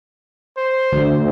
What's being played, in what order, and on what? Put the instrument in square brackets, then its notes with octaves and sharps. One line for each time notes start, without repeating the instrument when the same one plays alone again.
[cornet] C5
[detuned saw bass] D2